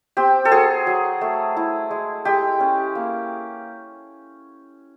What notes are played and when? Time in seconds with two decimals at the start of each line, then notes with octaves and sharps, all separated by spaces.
0.17 C4 G4
0.45 A4
0.51 F#3 G#4
0.87 F#3
1.21 A3
1.57 E4
1.91 G#3
2.25 G#3 G4
2.60 C#4
2.95 A#3